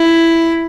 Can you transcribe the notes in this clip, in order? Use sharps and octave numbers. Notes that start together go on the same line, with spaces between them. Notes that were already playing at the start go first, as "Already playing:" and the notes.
Already playing: E4